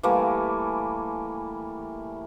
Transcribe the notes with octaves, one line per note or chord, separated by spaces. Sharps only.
E3 G3 A3 A#3